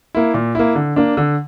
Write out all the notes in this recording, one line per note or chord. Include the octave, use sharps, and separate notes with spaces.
A#3 E4
A#2
A#3 E4
D3
A#3 D4
D3